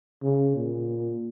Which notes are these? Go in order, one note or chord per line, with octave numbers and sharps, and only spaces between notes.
C#3
A#2